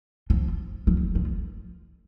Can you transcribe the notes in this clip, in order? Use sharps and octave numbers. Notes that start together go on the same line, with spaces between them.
F3
F3
F3